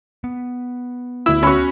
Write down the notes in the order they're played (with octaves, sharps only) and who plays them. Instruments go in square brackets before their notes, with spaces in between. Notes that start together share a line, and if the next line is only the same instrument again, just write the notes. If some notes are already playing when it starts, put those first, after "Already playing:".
[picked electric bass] B3
[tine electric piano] D2 E6 [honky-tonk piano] E4
[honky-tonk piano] C#4 F#4 [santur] B5 C#6